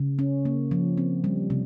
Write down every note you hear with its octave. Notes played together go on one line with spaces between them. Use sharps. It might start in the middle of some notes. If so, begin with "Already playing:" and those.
Already playing: C#3
C#4
A#3
F3
C4
G3
C3